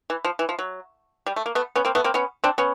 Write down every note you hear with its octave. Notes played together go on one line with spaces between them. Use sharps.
E3
F3
E3
F3
F#3
G3
A3
A#3
A3 B3
B3 C#4
A#3 C4
A3 B3
A#3 C4
B3 C#4
C4 D4
B3 C#4